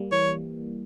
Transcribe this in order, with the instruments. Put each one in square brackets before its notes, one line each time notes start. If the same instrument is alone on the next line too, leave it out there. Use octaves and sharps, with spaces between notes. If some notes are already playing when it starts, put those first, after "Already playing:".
Already playing: [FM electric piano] G3 A#3
[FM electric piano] E3 [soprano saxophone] C#5